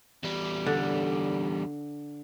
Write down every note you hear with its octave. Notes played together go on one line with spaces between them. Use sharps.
E2 G3
D3